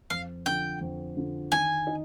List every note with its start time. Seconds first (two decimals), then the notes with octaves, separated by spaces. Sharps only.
0.10 F2 F5
0.46 D3 F3 G5
0.81 F2
1.17 D3 F3
1.52 D#3 G#5
1.87 D#4